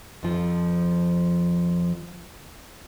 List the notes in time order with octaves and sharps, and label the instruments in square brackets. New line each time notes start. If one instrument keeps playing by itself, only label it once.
[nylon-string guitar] F2 F3